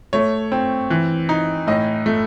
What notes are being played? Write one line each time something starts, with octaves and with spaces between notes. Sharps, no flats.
A3 C#5
C4
E3
D#4
A2 D#5
A3